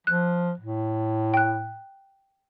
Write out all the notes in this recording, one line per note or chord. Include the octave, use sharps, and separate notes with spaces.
F3 F#6
A2
G5 F#6